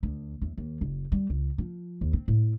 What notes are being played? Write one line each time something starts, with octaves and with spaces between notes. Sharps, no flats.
D2
E2
D#2
F#1
G3
C#2
F3
D#2
C4
A2